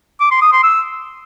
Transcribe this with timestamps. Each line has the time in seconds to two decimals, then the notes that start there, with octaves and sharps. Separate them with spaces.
0.21 D6
0.31 C6
0.42 D#6
0.53 C6
0.63 E6